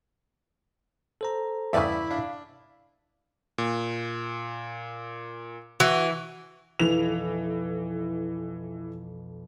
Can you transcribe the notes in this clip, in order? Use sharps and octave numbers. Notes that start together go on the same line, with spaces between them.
A4 C5 A#5
E2 G2 C#3 E4 B4 D5 E5
D4 F5
A#2
E3 F#4
B1 F2 E3 F7